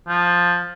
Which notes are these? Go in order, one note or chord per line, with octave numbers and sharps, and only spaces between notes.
F3